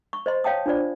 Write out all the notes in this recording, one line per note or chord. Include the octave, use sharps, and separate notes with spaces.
C#6
C5 D#5 C6
C#5 F5 G5 A5 D#6
D4 F4 C5 D5